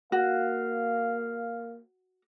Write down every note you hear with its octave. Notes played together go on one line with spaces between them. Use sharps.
A#3 F#4 F5